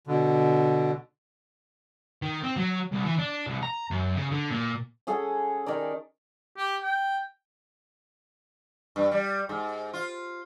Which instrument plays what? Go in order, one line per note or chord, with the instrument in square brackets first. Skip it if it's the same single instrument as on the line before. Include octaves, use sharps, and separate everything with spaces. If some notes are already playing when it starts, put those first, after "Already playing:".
[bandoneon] B2 D3
[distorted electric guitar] D#3
C4
F#3
C2
E3
D4
C2
A#5
F#2
C#3
D3
A#2
[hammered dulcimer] C#4 G#4 A4 F#5
D#3 G4 A#4 D5
[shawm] G4
G5
[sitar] G2
G3
G#2
F4